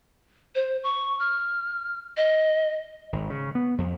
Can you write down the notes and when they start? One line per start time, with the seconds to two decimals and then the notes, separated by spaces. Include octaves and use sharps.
0.55 C5
0.83 C#6
1.19 F6
2.17 D#5
3.13 G#1
3.30 C#3
3.55 B3
3.78 F2